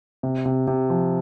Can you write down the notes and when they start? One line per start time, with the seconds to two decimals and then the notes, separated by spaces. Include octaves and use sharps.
0.23 C3
0.46 C3
0.68 C3
0.90 F3